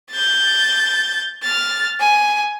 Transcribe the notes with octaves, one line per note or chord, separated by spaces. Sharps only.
G6 A6
F6 A6
G#5